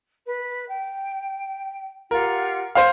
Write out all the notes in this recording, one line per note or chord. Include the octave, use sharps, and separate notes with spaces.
B4
G5
F4 G4 A#4 F#5
C5 C#5 F5